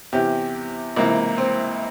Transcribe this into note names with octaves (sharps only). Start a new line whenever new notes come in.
E2 C3 E3 G4
C#2 C3 E3 A#3
C4